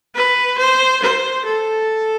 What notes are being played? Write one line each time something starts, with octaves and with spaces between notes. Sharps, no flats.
B4
C5
C5
A4